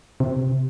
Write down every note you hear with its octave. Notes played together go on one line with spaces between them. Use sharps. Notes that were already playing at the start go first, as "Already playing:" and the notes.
C3